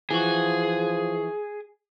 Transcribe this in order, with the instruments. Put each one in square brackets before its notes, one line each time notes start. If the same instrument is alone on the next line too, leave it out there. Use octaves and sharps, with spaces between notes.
[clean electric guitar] E3 F#4 [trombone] F3 [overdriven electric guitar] G#4